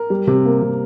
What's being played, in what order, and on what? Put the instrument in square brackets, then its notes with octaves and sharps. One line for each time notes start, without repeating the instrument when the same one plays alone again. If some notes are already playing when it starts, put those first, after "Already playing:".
Already playing: [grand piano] A#4
G3
C3
A#3
C3